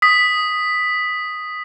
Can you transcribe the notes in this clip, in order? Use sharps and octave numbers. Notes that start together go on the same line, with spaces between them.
D#6 B6